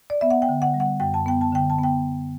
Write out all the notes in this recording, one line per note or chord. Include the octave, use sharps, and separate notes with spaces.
D5
B3 E5
F#5
G5
D3
F#5
G3
F#5
F#2 G5
A5
B3 G5
A5
D3 G5
A5
B3 G5